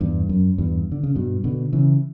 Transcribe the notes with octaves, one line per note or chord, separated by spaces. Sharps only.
E2 G2
F#2
E2 G2
D3
C#3
G2 B2
B2 D3
C#3 E3